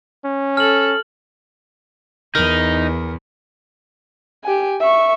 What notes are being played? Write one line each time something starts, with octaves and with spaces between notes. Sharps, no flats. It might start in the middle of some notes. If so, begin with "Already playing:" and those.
C#4
A4 F6 F#7
E2 D#4 A#4 B5
G4 G#5
E5 C#6